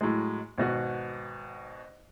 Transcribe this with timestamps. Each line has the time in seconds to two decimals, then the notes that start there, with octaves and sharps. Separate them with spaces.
0.01 A2 F#3 G#3
0.58 G#1 B2 F#4